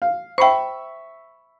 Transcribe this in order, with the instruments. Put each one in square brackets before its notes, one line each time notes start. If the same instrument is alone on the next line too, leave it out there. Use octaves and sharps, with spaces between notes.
[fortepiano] F5
[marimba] C5 G5 [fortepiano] E5 B5 C#6